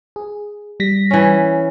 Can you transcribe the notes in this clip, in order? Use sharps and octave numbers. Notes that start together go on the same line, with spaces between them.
G#4
G3 A#6 B6
E3 C#4